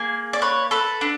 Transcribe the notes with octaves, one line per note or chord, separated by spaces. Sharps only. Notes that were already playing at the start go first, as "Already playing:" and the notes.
Already playing: A#3 G#4
D5
B4 C#5
A4 B4
D4